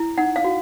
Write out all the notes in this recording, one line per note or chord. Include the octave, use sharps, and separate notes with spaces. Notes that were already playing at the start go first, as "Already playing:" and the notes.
Already playing: E4
D#4 F#5
F5
F#4